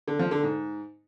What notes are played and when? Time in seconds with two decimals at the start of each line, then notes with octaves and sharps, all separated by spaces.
0.08 D3
0.19 F3
0.31 D3
0.43 G#2